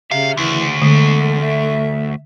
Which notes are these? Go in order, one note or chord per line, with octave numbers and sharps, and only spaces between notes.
C#3 G4 E5 F5
D2 C#3 E3
E2 D3 G#3 A3
E5